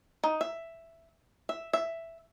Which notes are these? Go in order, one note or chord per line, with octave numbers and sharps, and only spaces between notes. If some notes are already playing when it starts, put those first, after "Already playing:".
D#4
E5
E5
E5